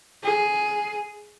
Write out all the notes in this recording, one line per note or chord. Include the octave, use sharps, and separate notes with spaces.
G#4